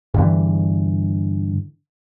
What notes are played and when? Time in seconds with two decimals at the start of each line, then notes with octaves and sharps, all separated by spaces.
0.14 G2 D3 E3